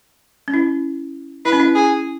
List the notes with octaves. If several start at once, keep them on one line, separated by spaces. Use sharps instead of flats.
C#4
E4
E4 B4
C#4
E4
G#4